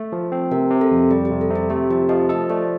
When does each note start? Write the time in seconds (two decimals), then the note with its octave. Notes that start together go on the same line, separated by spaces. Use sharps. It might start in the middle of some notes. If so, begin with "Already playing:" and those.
Already playing: A3
0.12 F3
0.32 C4
0.51 C3 A#4
0.71 C3
0.81 A4
0.91 F2
1.11 G3 G4
1.25 G4
1.31 C3
1.41 A4
1.50 C3
1.55 G4
1.70 A3 G4
1.90 F3 G4
2.09 F3 D#5
2.29 A4 D#5
2.50 A3 D5